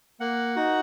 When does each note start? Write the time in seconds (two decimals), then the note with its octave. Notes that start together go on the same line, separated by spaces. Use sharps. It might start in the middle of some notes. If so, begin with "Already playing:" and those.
0.20 A#3 F#5
0.56 D#4 F#4